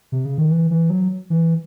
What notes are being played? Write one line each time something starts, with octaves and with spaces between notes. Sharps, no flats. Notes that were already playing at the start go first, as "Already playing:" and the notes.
C3
C#3
D#3
E3
E3
F#3
E3